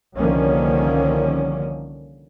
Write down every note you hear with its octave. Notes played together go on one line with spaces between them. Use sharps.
C2 D3 D#3 F3 A#3 C#4